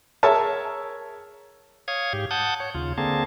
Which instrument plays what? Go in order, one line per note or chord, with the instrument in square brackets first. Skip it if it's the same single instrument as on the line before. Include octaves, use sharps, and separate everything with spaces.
[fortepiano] G#4 A#4 C#5 E5 A5
[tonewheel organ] C#5 F5 D#6 G#6
G#2 G4
F#5 A5 D#6 G6
C#5
D#2 C#3 F4
D3 A#3 C4 G#4 A5